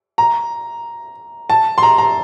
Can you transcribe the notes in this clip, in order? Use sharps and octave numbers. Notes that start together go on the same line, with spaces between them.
A#5
A5
C6
A#5
A#5